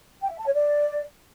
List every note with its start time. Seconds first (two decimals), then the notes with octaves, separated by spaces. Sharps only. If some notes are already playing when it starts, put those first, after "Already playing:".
0.22 G5
0.30 E5
0.38 A5
0.46 C#5
0.54 D5